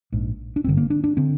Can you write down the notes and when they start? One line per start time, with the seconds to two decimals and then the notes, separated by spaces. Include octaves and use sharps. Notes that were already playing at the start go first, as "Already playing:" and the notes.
0.12 A#1 G#2
0.56 D4
0.64 G#1 G2 D3 C4
0.77 A#3
0.90 D4
1.04 D4
1.17 D3 C4